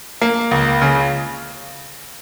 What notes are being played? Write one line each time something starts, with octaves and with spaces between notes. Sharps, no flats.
A#3
C#2
C#3